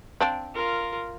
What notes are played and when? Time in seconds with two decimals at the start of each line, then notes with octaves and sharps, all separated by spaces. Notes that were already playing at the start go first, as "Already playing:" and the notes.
0.21 C4 D4 F5
0.54 F4 A#4